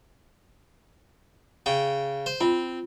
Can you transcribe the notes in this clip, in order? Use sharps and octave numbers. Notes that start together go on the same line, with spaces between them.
C#3 G5
C5
C4 F4